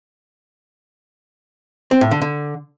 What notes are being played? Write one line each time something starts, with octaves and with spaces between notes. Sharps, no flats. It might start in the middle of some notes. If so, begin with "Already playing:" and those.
C4
A2
D3
D3